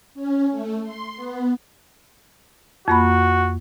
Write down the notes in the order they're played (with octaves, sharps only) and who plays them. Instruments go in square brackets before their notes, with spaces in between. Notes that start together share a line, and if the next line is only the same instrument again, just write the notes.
[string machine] C#4
A3
C6
B3
[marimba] F2 A#3 B5 [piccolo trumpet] F#4